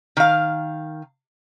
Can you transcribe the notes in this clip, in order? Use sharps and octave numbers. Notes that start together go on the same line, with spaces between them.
D#3 F5